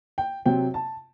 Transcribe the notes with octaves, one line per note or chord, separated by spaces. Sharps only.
G5
C3 F#3 C4 G5
A5